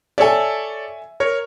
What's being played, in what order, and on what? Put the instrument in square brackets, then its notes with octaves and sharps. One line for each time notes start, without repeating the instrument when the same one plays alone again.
[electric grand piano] A4 C#5 D5 [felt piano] E5 G#5
[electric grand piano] A#4 C#5